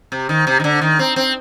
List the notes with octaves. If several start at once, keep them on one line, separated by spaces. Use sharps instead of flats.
C3
D#3
C3
D#3
D3
D#3
C4
C4